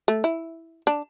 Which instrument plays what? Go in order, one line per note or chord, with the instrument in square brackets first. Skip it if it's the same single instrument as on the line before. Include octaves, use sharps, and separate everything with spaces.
[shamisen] A3
E4
D4